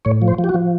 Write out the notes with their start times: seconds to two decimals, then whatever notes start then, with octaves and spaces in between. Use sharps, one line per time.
0.05 A2 C#5
0.22 F3
0.28 C5
0.39 F3
0.44 G4
0.49 F#4
0.54 F3